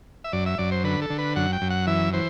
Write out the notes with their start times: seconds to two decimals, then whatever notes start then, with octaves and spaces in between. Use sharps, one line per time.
0.24 E5
0.33 F#2 D5
0.46 E5
0.58 F#2 D5
0.72 C5
0.84 D3 B4
1.02 A4
1.10 D3
1.18 B4
1.36 F#2 F#5
1.53 G5
1.61 F#2
1.70 F#5
1.87 E3 E5
2.13 E3 C5